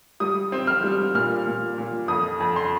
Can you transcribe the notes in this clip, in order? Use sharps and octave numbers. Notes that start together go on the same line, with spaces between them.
G3 D#6
C4
F6
G3
A#2 F6
A#2
A#2
F2 D#6
F2
C6